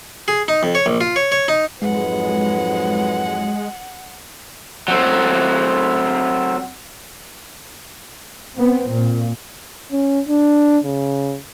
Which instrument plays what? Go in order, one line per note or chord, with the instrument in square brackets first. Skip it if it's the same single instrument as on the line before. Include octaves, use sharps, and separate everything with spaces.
[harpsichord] G#4
D#4
F2
C#5
A#1
F4
C#5
C#5
D#4
[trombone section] F2 G#2 F#3 [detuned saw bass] G#3 [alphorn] B4 [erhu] F#5
[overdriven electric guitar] F#3 C4
[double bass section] B3 C4
A#2
[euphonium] C#4
D4
C#3